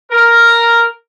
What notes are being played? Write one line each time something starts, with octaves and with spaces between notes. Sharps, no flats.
A#4